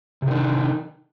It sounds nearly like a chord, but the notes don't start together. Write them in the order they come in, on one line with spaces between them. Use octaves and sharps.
C3 D#3 D4 D#4